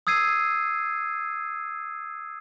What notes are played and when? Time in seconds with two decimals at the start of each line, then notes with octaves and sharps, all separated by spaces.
0.07 D#6 E6 G#6 C7 D#7